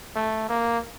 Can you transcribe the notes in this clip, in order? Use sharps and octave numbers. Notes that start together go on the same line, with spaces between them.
A3
A#3